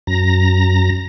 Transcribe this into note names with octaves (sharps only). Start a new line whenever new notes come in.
F#2 A#5 A#6